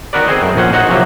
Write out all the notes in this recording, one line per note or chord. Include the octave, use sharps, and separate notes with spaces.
D#3 B3 F#4 A#4 B4 D5
C4 G#4 C5 D#5
F#2 G#3
A#1 A#2 C#4 C5 F#5
D#4 F#4 C5 C#5 D#5 F#5
C3 F3 F#3 A#3